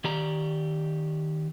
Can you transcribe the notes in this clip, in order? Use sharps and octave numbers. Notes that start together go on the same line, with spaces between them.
D#3 G4 D5 A#5